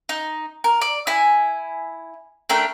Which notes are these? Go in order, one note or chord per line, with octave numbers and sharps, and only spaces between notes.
D#4
A#4
D5
E4 G#5
A3 D4 A#4 G5